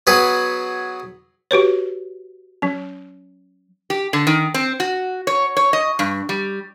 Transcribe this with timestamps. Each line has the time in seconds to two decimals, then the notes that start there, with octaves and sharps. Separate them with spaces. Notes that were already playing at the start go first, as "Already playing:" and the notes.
0.07 F#3 B3 G#4 B4
1.51 F#4 G4 B4 C#5
2.62 F#3 C#4
3.90 G4
4.13 D3
4.27 D#3
4.54 C4
4.80 F#4
5.27 C#5
5.57 C#5
5.73 D#5
5.99 G2
6.29 G3